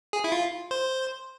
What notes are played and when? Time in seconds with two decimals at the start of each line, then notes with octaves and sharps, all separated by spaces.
0.13 G#4
0.24 E4
0.32 F4
0.71 C5